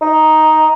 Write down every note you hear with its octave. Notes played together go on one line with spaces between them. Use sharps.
D#4